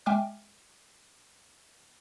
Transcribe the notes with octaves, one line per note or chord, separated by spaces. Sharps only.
G#3 E5 G5 G#5 D6 F6